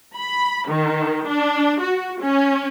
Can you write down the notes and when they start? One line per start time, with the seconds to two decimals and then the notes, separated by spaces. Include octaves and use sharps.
0.16 B5
0.68 D#3
1.28 D4
1.80 F#4
2.22 C#4